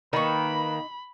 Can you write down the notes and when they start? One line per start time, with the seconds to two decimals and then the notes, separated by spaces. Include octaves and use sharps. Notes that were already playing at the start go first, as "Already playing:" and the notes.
0.13 D#3 A#3 D#4 B4 B5 C#6